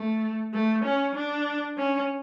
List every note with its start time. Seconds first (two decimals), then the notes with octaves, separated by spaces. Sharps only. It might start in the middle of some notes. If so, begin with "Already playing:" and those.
Already playing: A3
0.53 A3
0.84 C#4
1.15 D4
1.77 C#4